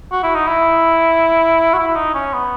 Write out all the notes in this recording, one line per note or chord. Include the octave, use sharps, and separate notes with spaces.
F#4
E4
D#4
E4
F#4
E4
D#4
C#4
B3